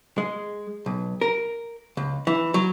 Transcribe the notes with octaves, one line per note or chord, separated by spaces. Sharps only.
G#3
B1
A#4
C#2
E3
F#3